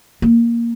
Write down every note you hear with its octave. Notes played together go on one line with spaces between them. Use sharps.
A#3